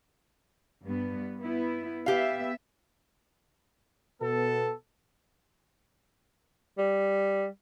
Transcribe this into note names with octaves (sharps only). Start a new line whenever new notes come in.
G2 B3
B3 E4
B3 G4 E5 F5
B2 B3 A4
G3